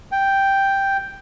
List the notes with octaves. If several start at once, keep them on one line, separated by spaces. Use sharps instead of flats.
G5